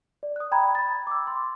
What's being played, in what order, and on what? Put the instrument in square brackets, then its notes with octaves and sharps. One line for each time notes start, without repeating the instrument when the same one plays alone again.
[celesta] D5
D#6 F#6
G5 A#5 B5 G#6
B5 A6
D6 E6
C6